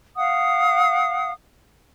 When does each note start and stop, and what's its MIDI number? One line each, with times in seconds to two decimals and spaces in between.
0.16 1.31 77
0.16 1.31 78
0.16 1.31 87